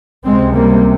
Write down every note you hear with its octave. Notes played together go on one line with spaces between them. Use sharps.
C#2 C3 G#3 C4
G3 A#3